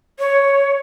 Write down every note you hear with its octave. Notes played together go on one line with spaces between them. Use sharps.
C#5